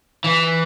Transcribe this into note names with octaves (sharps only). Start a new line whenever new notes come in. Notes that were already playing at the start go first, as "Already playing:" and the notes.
E3